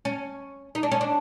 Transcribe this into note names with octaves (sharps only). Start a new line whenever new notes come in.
C#4
D#4
D4
C#4
D4